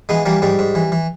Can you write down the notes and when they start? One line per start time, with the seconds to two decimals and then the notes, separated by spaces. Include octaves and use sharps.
0.09 E3 G#3 B3
0.25 E3 G3 A#3
0.42 G#2 G3
0.59 G#2
0.75 E3
0.92 E3